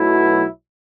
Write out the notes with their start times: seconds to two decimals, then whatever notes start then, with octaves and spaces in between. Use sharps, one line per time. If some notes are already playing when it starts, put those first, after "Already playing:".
Already playing: B1 B2 F#3 A3 E4